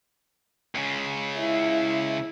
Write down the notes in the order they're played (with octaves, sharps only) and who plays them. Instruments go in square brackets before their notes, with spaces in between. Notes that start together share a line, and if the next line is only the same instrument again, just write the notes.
[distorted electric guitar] C#2 C#3
[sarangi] E4